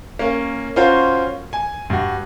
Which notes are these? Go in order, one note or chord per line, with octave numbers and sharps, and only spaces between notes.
A#3 C#4
C#4 F4 F#4 A#4 C5
G#5
G2 F#4